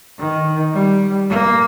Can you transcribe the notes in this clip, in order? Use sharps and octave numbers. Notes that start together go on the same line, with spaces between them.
D#3
G3
A#3